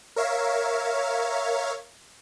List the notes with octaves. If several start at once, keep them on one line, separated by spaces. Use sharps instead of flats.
A#4 C#5 E5 F5